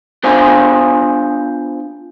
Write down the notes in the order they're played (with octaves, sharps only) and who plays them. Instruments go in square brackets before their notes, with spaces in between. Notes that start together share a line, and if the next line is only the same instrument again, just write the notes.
[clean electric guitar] B3 D4 F4 C5 F5 G#5